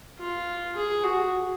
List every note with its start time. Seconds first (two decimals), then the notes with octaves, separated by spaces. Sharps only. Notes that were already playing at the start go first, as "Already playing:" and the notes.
0.19 F4
0.76 G#4
1.04 F#4